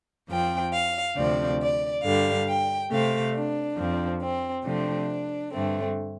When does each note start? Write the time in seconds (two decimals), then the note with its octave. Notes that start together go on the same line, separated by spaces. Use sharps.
0.28 F2 F3 C4 G5
0.72 F5
1.15 D2 C3 F3 C4 D5
1.60 D5
2.03 G2 D3 G3 F5
2.47 G5
2.90 C3 A3 C4 F5
3.33 D4
3.77 F2 F3 C4
4.21 C4
4.64 C3 F3 A3 C4 D4
5.52 G2 D3 A3 C4